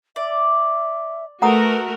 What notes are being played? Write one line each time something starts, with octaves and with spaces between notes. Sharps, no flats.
D5 E5
A3 F#4 A#4 B4 F#5 A#5 D#6